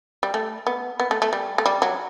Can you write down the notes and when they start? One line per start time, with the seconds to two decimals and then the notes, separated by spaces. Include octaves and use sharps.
0.23 G3
0.34 A3
0.67 B3
1.00 B3
1.11 A3
1.22 A3
1.33 G3
1.58 A3
1.66 G3
1.82 F#3